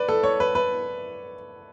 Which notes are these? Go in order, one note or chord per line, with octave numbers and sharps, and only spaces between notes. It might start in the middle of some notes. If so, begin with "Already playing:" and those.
Already playing: B4 D5
A4
C#5
B4
B4